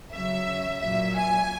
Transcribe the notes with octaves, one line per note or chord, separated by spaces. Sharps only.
C#3 F#3 E5
A#2 F#3 E5
G#5